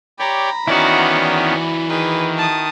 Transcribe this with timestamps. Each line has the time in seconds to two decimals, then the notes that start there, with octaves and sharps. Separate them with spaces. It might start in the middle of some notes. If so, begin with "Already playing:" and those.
0.19 G4 C#5 D5 A#5 B5
0.68 D#3 E3 B3 C#4 E4 F#4 D5
1.89 D#3 G#4 B4
2.37 A5 D#6